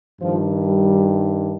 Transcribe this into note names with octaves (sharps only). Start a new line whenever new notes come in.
G2 D#3 F3
G3